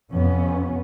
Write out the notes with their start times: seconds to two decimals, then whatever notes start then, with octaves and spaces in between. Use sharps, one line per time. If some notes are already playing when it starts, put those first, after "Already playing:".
0.12 F2 C3 B3 C#4